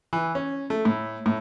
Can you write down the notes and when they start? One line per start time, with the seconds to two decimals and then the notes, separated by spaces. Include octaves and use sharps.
0.13 E3
0.35 C#4
0.70 A3
0.85 A2
1.26 A2